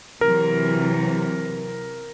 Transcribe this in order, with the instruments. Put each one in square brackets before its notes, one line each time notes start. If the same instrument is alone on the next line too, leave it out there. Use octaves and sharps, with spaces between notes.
[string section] C3 E3 F#3 [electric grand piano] A#4